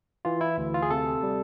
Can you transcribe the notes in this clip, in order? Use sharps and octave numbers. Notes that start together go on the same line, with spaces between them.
E3 F4
E4
D2
F4
G#4
C3 A4
G3